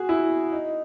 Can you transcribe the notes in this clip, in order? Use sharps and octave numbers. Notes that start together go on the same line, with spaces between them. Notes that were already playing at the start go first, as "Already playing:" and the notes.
Already playing: F#4 G#4
E4
D#4